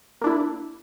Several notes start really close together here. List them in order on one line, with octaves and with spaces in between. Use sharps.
A#3 D4 E4